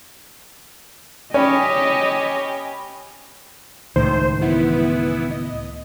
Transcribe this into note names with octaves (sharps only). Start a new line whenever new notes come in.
C#4 G4 C#5 D#5 G5 G#5 B5
C#2 A2 D#3 C5
E3 B3 E4
D#5